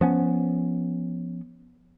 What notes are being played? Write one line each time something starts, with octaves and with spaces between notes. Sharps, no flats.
F3 B3 C#4